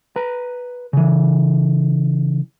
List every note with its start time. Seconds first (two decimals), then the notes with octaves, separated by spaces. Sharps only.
0.16 B4 A#5
0.93 C#3 E3